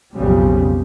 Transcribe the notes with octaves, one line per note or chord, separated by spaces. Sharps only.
B1 F2 C#3 G3